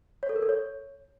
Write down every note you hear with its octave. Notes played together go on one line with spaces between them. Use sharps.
C#5
A4
A#4
A4
C#5